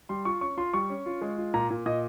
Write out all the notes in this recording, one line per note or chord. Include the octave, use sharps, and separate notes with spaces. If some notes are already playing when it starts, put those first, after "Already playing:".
G3 C6
F4 C#6
C#4 C#6
F4 C6
G3 C#6
C#4
F4
G#3
F4
A#2 A#5
A#2
A#2 D#5